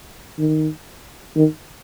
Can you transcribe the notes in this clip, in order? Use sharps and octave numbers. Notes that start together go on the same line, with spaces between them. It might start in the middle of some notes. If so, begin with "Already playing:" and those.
D#3
D#3